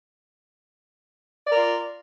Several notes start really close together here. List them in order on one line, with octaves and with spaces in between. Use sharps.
D5 A#4 F4